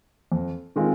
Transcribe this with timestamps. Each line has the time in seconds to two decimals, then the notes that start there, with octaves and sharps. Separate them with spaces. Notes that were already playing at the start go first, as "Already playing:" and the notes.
0.32 F2
0.76 D#3 G#3 C4 F4